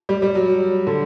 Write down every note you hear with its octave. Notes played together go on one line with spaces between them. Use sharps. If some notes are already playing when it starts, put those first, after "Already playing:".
G3
G3
F#3
D3